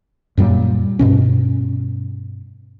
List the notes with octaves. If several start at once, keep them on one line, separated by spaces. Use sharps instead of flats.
F#2 A#2 G3
G2 B2 C#4